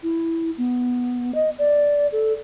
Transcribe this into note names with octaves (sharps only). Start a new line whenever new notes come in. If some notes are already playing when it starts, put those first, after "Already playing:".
E4
B3
D#5
D5
A4